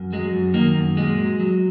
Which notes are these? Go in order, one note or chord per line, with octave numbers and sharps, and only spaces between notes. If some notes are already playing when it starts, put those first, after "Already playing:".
Already playing: F#2
F#3 G#3
F#2
D#3 A#3
F#2
A#2 G#3
F#3
F#3